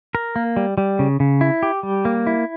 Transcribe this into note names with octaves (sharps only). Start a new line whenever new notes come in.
A#4
A#3
G3
G3
C#3
C#3
E4
G4
G3
A#3
E4